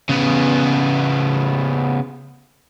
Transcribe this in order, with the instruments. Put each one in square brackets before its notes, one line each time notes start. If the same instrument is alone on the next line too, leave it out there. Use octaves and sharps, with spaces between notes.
[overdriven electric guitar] C#3 B3